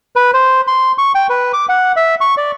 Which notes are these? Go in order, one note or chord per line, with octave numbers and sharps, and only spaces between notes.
B4
C5
C6
C#6
G5
B4
D6
F#5
E5
C#6
D5